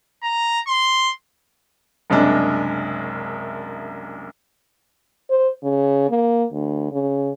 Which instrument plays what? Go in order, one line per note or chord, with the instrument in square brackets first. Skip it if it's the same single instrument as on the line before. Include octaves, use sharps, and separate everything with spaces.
[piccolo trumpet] A#5
C6
[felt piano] F#1 C2 G#3 D4
[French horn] C5
C#3
A#3
D2
C#3